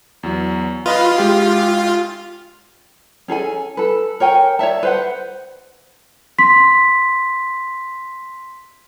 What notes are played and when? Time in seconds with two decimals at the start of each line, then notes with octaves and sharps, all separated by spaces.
0.23 E2 F#3
0.86 F4 B4 D#5 B5
1.18 G#3 G4
3.28 C#4 G#4 A4 G#5
3.77 A4 B4
4.20 A#4 C#5 G5 G#5
4.59 C#5 D5 E5 A5
4.83 B4 C5 F#5
6.39 C6 B6